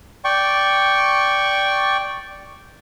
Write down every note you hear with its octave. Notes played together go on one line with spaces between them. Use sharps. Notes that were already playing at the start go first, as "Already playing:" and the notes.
D5 G5 C#6